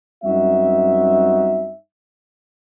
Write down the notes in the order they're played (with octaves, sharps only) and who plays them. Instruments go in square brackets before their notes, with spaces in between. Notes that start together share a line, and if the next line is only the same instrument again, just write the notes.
[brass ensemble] F#2 G3 C4 D#4 F#4 E5